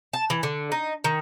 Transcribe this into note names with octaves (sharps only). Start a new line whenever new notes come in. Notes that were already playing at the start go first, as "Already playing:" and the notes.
A5
E3
D3
D#4
D#3